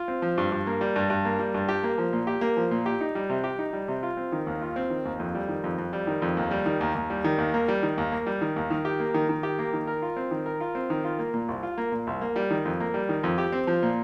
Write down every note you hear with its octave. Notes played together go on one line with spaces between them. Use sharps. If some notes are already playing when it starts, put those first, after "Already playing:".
Already playing: F4
C4
F3
G2
G2
A#3
G3
G2
G2
A#3
G3
G2
G4
A#3
F3
A#2
G4
A#3
F3
A#2
G4
D#4
G3
C3
G4
D#4
G3
C3
F4
C4
D#3
D#2
F4
C4
D#3
D#2
F2
G3
D#3
F2
F2
G3
D#3
F2
D#2
G3
D#3
D#2
D#2
G3
D#3
D#2
A#3
G3
D#3
D#2
A#3
G3
D#3
D#2
D#3
G4
A#3
D#3
D#3
G4
A#3
D#3
A#4
F4
C4
D#3
A#4
F4
C4
D#3
F4
A#3
A#2
C2
F4
A#3
A#2
C2
A#3
G3
D#3
F2
A#3
G3
D#3
F2
G4
C4
F3
A#2